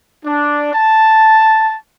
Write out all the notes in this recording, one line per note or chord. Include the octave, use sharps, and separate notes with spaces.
D4
A5